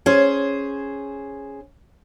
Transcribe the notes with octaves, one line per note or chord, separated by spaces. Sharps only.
C#4 G#4 C5